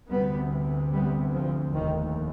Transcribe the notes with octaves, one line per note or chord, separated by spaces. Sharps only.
D2 C3 G3 B3
G3 B3
D3 F3
F1 D#2 D#3